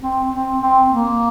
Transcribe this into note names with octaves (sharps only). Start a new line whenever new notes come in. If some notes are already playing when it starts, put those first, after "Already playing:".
C4
C4
C4
A#3